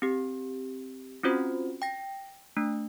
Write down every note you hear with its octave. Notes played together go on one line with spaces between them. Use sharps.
C4 G4
C4 C#4 F4 F#4 C5
G5 A#6
A3 D4